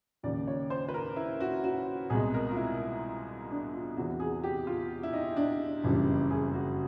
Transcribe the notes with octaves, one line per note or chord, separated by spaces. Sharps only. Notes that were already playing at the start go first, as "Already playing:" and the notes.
D#2 C#3 F3 D5
C#5
C5
B4
A#4
E4
F#4
F#4
C2 B2 G#3 G#4
A#4
F4
E4
D4
F4
E2 C3 E3 F#4
G#4
G4
F4
E4
D#4
D4
F#1 F2 C#3 E3 G3
G#4
F#4